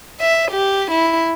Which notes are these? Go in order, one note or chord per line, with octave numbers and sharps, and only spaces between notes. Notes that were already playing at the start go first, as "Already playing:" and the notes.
E5
G4
E4